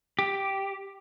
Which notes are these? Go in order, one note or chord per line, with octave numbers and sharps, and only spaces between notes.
G4